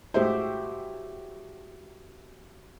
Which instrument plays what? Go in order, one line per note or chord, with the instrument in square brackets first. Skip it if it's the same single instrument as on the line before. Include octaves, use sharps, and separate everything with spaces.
[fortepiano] A2 G#3 C5 [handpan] F#4 G4 E5